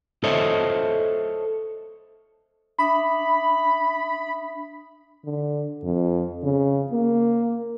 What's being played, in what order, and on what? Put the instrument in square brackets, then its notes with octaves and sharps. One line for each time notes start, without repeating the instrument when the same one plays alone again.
[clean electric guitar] A4 C5 C#5 D#5 E5
[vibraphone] D4 E5 D#6 [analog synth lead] B5
[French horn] D3
F2
C#3
A#3